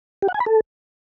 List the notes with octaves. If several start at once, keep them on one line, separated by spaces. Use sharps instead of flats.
G4
F#5
G#5
B5
A4